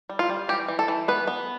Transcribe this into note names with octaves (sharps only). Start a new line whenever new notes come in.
G3
F4
G3
E3 G4
E3
A4
E3
B3 B4
B3